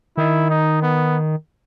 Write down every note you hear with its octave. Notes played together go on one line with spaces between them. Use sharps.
D#3 E4
D#4
B3